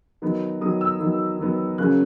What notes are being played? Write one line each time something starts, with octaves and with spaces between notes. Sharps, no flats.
D#3 F#3 B3
D#3 F#3 B3 D#6
E6
D#3 F#3 B3
D#3 F#3 B3
C#3 F#3 A#3 C#4 F#6